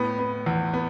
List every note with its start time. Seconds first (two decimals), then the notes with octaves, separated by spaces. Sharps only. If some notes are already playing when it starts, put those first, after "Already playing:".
Already playing: A2 B3
0.19 B3
0.46 E2
0.74 B3